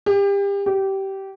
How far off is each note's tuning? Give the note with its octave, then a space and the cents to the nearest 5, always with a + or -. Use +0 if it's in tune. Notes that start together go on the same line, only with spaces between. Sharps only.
G4 +30
G4 -20